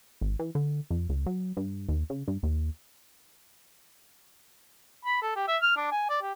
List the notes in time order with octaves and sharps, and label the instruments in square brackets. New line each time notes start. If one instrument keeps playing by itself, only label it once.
[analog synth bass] G#1
E3
D3
F2
C#2
F#3
G2
D#2
C#3
G2
D#2
[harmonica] B5
A4
G4
E5
F6
D4
G#5
D5
G4